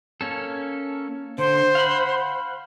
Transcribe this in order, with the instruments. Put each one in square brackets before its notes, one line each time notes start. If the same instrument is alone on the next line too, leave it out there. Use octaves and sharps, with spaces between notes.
[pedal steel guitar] A#3 C#4 A4
[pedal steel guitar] D3 [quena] C5
[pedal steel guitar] F5 F#5 B5